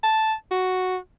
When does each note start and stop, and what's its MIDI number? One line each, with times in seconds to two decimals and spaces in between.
0.03 0.33 81
0.51 0.96 66